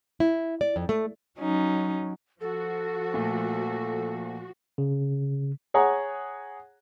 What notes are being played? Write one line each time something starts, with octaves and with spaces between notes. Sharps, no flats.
E4
D5
F2
A3
F#3 C#4 D#4
F3 F#4 A4
A#2 A3
C#3
G#4 C#5 F#5 G#5 A#5